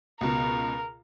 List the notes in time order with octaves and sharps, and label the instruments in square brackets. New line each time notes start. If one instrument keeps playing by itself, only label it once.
[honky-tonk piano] C#2 B2 [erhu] A#4